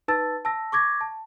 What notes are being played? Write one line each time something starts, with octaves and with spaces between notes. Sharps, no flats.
D#4 B4 A5 E6 A6
A5 E6 A#6
C#6 D6 G#6 A#6
A5